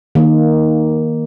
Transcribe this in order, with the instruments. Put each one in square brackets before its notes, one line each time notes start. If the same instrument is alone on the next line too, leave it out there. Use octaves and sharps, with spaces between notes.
[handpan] D#3 A#3